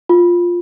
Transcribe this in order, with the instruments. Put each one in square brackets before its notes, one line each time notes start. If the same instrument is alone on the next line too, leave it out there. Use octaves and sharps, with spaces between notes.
[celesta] F4